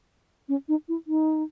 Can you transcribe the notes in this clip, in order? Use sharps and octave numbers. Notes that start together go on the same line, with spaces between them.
C#4
D#4
E4
D#4